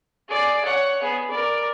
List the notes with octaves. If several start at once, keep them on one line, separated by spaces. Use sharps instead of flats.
G#4 D5
C#5 F#5
B3 G#4
A#4 D5